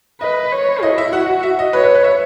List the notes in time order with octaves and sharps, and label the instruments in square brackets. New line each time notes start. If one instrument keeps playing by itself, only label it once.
[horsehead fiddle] B4 [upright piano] D#5
[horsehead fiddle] C#5
[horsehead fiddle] E4 [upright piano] D#5
[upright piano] E5
[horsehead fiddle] F#4 [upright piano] F#5
[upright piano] E5
D#5
[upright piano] B4 [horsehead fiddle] C#5
[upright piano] B4
B4
E5